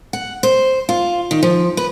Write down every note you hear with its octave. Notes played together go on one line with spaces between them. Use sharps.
F#5
C5
F4
D#3
F3
B4